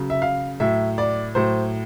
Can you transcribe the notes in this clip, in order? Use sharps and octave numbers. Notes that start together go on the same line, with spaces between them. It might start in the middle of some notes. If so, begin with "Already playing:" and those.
Already playing: C#3 F#3
E5
F5
A2 F#3 E5
D5
A2 F#3 C5